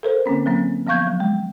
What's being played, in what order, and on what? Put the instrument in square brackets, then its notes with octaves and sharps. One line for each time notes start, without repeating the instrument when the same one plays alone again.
[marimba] A4 A#4 C5
D3 A#3 C4 C#4
F#3 A#3 C4
F3 B3 F5 C#6 G6 G#6
F#3
G#3